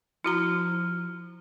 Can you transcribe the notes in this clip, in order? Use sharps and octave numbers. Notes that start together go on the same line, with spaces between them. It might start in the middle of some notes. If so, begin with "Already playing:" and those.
F3 E4 F#4 A#5 F6